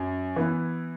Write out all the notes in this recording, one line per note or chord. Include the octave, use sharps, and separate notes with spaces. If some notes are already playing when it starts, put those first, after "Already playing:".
Already playing: F#2
E3 B3 E4